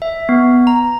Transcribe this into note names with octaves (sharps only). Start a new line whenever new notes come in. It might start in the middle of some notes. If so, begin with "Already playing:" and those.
E5
B3
A#5